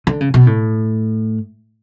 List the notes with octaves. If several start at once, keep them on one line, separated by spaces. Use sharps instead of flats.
D3
C#3
B2
A2